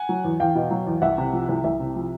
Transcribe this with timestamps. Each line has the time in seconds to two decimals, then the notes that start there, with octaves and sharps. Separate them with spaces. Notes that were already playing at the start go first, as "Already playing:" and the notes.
Already playing: F#5 G#5
0.09 F#3
0.24 E2
0.40 E2 F5 G5
0.55 B2
0.71 F#3
0.87 E2
1.02 C2 E5 F#5
1.18 C3
1.33 F3
1.49 C2
1.64 C2 E5
1.80 C3
1.96 F3